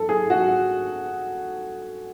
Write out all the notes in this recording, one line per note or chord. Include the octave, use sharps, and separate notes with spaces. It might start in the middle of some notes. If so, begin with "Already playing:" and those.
Already playing: A4
G#4
F#4